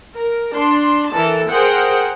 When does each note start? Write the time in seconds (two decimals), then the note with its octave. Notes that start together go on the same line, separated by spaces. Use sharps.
0.16 A#4
0.55 D4 C6
1.11 E3 A4 A#4 A5
1.52 G#4 A#4 C5 F#5 G5